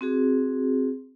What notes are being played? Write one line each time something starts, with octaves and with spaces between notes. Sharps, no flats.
C4 F#4 G#4